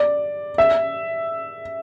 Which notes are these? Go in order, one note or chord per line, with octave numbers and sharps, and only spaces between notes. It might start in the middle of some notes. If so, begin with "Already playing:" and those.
Already playing: D5
E5